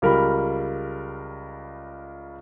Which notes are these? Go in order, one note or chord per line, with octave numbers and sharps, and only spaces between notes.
C#2 G3 A#4 A#5 B5